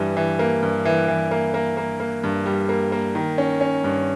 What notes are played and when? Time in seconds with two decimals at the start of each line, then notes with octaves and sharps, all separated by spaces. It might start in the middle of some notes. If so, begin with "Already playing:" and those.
Already playing: G2 E3 G3
0.17 E3
0.39 A#3
0.62 G2
0.85 E3
1.08 E3
1.31 A#3
1.54 A#3
1.77 A#3
2.00 A#3
2.24 G2
2.46 G3
2.69 A#3
2.92 A#3
3.15 D#3
3.38 C#4
3.61 C#4
3.84 G2